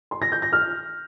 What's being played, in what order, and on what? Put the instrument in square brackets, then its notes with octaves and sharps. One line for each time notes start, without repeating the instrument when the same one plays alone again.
[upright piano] C6
A#6
G6
A#6
F6